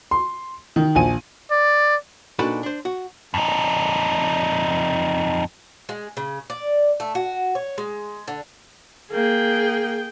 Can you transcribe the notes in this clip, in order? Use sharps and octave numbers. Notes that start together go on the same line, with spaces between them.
C6
D#3
A#1 G#5 D#7
D5
A#2 D4 D#4 F#4 A4 B4
D4 C5
F#4
F2 D#4
G#3
C#3
D5
A3
F#4
C#5
G#3
D3
A#3 G#4 G5